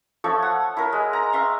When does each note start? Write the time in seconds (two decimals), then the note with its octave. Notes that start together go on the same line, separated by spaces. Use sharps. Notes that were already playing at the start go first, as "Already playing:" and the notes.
0.24 F3 A3 A4 C#5
0.42 F#5
0.77 E4 A#4
0.93 G#3
1.13 A#5
1.33 E5 F5 C6 C#6